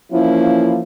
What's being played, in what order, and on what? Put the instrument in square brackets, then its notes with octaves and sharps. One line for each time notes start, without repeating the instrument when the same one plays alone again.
[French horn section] E3 F3 A#3 C#4 E4